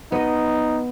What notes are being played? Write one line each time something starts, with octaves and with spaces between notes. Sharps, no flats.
B3 D#4 D#5